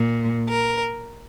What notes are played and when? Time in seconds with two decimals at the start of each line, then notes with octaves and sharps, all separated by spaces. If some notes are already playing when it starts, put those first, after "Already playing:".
Already playing: A#2
0.47 A#4